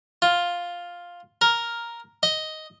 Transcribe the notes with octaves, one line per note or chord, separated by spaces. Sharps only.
F4
A#4
D#5